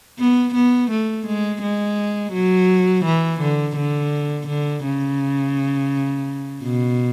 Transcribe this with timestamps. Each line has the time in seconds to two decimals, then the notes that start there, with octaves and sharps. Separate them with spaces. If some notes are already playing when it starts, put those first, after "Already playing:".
0.19 B3
0.55 B3
0.91 A3
1.27 G#3
1.62 G#3
2.33 F#3
3.05 E3
3.41 D3
3.76 D3
4.48 D3
4.84 C#3
6.63 B2